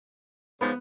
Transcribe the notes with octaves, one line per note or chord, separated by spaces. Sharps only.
G#2 C#3 F3 B3